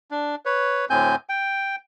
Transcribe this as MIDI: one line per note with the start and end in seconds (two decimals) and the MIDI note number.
0.11 0.35 62
0.45 0.85 71
0.45 0.85 73
0.90 1.16 38
0.90 1.16 45
0.90 1.16 60
0.90 1.16 80
0.90 1.16 91
1.29 1.76 79